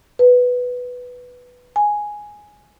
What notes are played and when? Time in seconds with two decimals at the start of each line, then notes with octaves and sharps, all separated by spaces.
0.19 B4
1.76 G#5